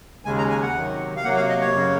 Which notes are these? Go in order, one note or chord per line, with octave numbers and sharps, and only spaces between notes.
D#2 C#3 G#3 G#5
A#5
G#5
F#5
C3 D#3 F#3
F5
C3 F#3 A#3 F#5
F5
D#5
C#5
F#2 C#3 F#3 A#3